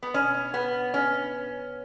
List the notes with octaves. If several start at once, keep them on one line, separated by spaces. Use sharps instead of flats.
B3
B2 C#4
B3
C#4